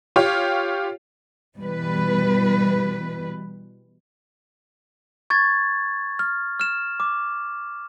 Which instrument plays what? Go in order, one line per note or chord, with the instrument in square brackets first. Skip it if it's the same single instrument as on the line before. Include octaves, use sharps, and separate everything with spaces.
[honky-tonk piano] F4 G4 C#5
[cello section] B2 E3 G3 B4
[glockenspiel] C#6 G#6 A6
F6
F6 E7
D6